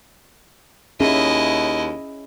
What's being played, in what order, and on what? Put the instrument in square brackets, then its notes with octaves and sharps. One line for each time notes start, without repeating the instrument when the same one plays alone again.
[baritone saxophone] D#2 [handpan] C#4 G#4 E5 [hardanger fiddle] E4 D#5